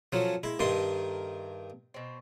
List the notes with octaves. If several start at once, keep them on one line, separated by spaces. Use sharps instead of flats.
F3 F#3 C#4 A4 F5
G#3 A#3 E4
G2 D#3 A4 A#4 E5 C6
B2 C4